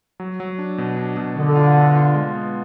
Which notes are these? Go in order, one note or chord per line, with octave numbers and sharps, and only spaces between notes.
F#3
F#3
D4
B2
D4
B2
D3 B3
F4
B3
F4
G#3
B3